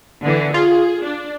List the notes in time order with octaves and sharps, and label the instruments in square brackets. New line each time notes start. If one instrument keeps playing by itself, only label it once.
[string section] D3 E3
[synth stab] F4 [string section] G#4
[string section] D4